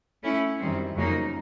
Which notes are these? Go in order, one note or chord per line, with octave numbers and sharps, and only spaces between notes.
A3 C#4 E4
F#2 D#3 G3 C4
F2 C#3 F#3 A#3 D#4